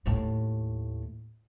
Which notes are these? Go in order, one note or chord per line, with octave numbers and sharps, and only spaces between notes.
D#2 A2